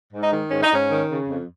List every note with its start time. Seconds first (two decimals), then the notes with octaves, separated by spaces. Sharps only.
0.13 G#2
0.22 D#4
0.32 D#3
0.51 G#2 C#4
0.63 D#4
0.71 G#2 C#4
0.91 D#3
1.10 C#3
1.29 F2